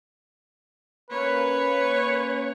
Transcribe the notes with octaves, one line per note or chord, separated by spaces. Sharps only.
A#3 C#4 B4 C#5